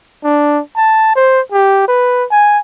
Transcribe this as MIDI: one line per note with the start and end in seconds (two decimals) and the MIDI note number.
0.24 0.60 62
0.76 1.11 81
1.16 1.41 72
1.52 1.86 67
1.88 2.25 71
2.31 2.59 80